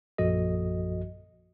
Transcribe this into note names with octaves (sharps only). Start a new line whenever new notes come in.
A#1 F#2 F3 F#4 A4 D#5